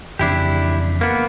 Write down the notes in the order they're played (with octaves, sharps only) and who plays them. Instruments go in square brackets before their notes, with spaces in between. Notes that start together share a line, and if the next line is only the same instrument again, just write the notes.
[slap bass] F2 C#3 E3 [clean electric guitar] D4 E4 G4
[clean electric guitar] A#3 B3